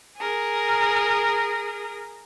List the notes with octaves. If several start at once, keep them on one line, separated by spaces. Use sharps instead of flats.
G#4 A#4